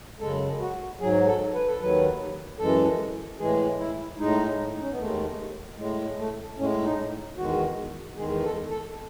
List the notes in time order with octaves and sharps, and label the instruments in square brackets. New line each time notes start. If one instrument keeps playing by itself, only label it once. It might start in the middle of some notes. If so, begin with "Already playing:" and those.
[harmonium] F#2 C#3 G#3 A4
F#4
G#2 F#3 G#4
A4
B4
A4
D#2 D#3 F#3 B4
F#2 E3 G#3 A4
A2 E3 G#3 G#4
E4
A2 G#3 D#4
D#4
C#4
B3
D#2 D#3 G#3 A3
A2 G#3
A3
A2 C#4
G#3
D#4
E2 D#3 G#3 F#4
E2 D#3 G#3 G#4
A4
A4